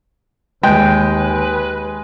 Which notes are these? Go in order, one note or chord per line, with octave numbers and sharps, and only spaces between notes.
D#2 G#3 B4 G5